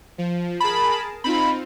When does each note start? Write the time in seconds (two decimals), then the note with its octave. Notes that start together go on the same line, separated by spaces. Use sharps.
0.18 F3
0.60 G#4 A#4 A5 B5
1.24 C4 D#4 F4 B5